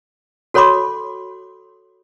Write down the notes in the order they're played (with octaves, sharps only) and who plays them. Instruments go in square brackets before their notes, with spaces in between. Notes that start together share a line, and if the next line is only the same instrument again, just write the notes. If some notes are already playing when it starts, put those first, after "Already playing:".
[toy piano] F#4 A4 C#5 B5 C6 D6